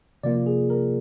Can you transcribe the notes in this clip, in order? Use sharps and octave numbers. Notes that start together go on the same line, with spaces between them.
C3 F3 A#3 F4 D5
G#4
A#4